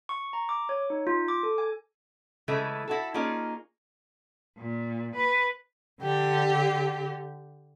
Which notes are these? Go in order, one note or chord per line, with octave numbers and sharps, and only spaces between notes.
C#6
A#5
D6
C#5
D#4
F4
D6
A4
G#5
C#3 E3 G#3 A3
E4 F#4 A4
A#3 C#4 D#4 F4 G#4
A#2
B4
D3 G4